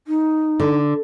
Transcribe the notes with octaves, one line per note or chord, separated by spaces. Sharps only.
D#4
D3